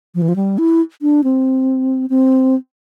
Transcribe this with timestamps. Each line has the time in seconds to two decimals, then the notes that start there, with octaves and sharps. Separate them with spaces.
0.15 F3
0.22 E3
0.29 F3
0.36 G3
0.58 E4
1.02 D4
1.24 C4
2.10 C4